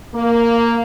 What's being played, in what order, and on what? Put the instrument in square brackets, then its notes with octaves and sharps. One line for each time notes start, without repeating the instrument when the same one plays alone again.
[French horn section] A#3